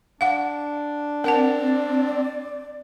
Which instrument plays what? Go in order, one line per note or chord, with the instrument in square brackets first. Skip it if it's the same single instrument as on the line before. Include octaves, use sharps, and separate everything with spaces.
[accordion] D4 [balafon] F5 F#5
[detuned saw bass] C4 [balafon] A#4 F#5 A5 [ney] D5